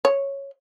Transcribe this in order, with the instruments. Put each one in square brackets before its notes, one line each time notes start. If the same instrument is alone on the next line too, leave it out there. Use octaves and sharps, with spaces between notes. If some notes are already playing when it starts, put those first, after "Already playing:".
[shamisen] C#5